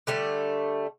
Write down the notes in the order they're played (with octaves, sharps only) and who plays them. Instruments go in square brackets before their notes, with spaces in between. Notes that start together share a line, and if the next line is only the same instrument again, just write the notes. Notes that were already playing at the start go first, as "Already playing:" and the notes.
[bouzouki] D3 G3 A3